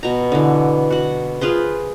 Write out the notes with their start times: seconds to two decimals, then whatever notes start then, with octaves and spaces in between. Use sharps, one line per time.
0.03 B2 A#5
0.32 D3 E3
0.90 F#4 F#5
1.41 F4 G#4 B4 C5